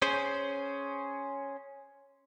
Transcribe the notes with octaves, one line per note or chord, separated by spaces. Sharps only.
C#4 G#4 C5